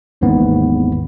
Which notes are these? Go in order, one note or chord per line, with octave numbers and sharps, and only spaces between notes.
G#1 D#2 G#2 E3 B3 C4